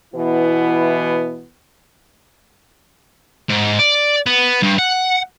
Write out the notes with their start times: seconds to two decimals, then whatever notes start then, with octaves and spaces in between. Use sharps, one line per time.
0.14 B2 E3 B3 E4
3.50 G#2
3.79 D5
4.26 B3
4.63 G2
4.79 F#5